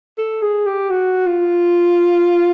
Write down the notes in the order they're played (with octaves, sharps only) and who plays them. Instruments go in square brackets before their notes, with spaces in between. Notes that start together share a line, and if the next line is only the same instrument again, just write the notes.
[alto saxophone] A4
G#4
G4
F#4
F4